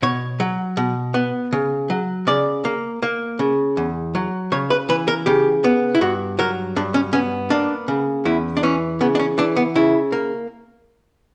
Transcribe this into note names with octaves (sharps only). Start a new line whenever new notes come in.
B2 C#5
F#3
B2
B3
C#3
F#3
C#3 D5
A#3
A#3
C#3
E2
F#3
C#3 C#5
B4
E3 B4
A#4
C#3 G4
B3
E4
G2 F#4
F#3 A#4
G2 D4
C#4
B3 C#4
A#3 D4
C#3
E2 E4
D4
E3 C#4
C#3 B3
D4
C#4
E3 D4
B3
C#3 E4
A#3